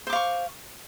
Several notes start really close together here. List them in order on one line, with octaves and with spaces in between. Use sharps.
C5 D6 F5 C#6